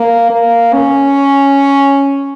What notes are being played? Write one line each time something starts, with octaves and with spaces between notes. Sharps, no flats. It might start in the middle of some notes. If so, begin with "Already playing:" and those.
Already playing: A#3
A#3
C#4